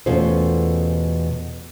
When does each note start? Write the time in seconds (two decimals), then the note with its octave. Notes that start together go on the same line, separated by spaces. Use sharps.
0.06 E2 B2 A3 C#4 F4 C5